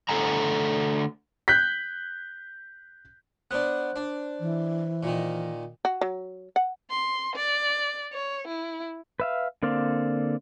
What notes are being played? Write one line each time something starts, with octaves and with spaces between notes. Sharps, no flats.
D3 A3 A4 F#5 G#5 A#5
F#6 G6 B6
B3 D4 C5 F#6
D4
E3
A#2 D#3
F#4
F#3
F#5
C6
D5
C#5
E4
B4 E5 F5
D3 A#3 C4 D5 F5